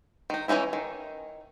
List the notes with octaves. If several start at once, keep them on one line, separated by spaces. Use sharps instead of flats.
D#3 D#4
E3 F3 C#4 D#4 E4
D#3